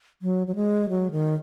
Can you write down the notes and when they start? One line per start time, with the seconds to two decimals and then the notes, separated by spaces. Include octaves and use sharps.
0.22 F#3
0.47 F#3
0.55 G#3
0.89 F#3
1.11 D#3